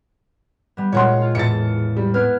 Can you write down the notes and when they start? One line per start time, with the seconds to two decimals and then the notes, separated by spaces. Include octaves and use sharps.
0.77 G3 B3
0.92 A#2 C#3 G#3 C#5 F#5 C6
1.22 F4
1.35 E2 A2 C#3 A6 C#7
1.97 G3
2.14 B3 F6 F#6 G#6